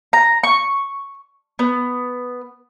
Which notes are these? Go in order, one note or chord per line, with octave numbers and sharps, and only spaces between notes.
A#5
C#6
B3